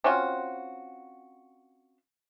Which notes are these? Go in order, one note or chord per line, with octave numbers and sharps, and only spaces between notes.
C4 C#4 F4 F#4